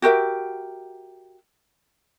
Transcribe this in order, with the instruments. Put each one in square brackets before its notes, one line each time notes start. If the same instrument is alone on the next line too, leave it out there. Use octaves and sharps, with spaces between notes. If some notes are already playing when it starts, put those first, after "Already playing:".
[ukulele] F#4 G4 A#4 E5